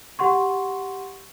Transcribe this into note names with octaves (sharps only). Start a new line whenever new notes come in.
G4 F#5 C6 C#6